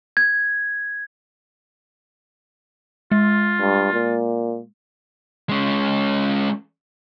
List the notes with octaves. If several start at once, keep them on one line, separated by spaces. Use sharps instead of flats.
G#6
G#3 F4
G2
A#2
G#3 C#4